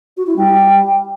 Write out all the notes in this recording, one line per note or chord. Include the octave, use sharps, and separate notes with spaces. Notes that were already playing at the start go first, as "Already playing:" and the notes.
F#4
E4
G3